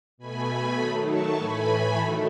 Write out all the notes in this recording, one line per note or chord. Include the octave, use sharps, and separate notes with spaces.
B2 A3 G#5 B5
D#3 F#3 A3 B5 D#6
A5 C#6
A2 E3 A3 G#5 B5
D#3 F#3 A3